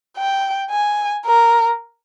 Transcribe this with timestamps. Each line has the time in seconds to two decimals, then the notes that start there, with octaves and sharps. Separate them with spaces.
0.17 G5
0.71 G#5
1.26 A#4